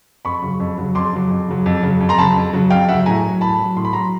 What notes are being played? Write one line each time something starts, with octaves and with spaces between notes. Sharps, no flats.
F2 B5 C#6
C#3 F#3
F2
C#3 F#3
F2 C6 D6
C#3 F#3
F2
C#3 F#3
F2
C#3 F#3
F2
A#5 C6
C#3 F#3 A5 B5
F2
C#3 F#3
F2 F5 G5
C#3 F#3 E5 F#5
A2 G#5 A#5
F#3
A2 A5 B5
F#3
A2 C6
B5
F#3 A#5 C6